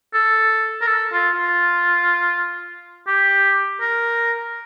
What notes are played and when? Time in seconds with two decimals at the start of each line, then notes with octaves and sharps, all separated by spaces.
0.14 A4
0.82 A#4
0.87 A4
1.13 F4
1.36 F4
3.08 G4
3.81 A#4